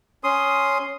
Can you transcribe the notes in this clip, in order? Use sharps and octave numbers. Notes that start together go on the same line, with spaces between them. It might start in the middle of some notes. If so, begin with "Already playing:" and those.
C#4 C6 D#6